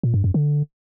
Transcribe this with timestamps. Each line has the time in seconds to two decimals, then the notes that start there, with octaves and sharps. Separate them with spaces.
0.03 A#2
0.14 G2
0.24 F#2
0.34 D3